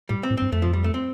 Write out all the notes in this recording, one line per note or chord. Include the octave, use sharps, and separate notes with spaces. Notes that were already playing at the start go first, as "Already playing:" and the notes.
A2 G3
C4
A2
G2 C4
F2 A3
F3
G3
A3
C4